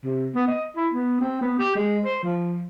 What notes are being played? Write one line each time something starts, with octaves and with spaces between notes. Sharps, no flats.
C3
B3
D#5
E4
B3
C4
B3
G4
G#3
C5
F3